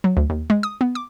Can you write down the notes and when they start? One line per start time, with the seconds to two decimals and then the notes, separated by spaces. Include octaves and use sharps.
0.04 F#3
0.17 D2
0.30 D#2
0.50 G#3
0.63 D#6
0.81 B3
0.95 D6